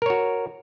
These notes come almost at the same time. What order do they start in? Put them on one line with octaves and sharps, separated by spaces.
A#4 C#5 F#4